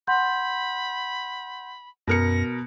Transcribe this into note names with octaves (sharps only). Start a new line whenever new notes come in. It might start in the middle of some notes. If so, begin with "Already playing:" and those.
F#5 B5 C6 G6
F#2 B2 A#4 A#6 C#7